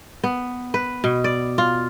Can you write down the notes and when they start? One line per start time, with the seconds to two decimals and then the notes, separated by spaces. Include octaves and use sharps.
0.24 B3
0.74 B4
1.04 B2
1.24 D5
1.58 F4